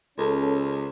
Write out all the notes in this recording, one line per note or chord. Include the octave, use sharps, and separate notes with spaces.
C#2 C#4 A4